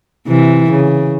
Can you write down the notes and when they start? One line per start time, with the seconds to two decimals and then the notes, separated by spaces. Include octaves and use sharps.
0.27 C3 E3
0.71 C#3